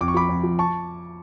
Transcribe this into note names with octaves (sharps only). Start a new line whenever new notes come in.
F2 D6
C#6
F3 B5 D6
F2
F3
A5 C#6